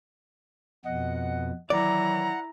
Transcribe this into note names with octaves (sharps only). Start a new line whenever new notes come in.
F2 B2 D#5 F#5
D#3 E3 F#3 E4 D5 F#5 A#5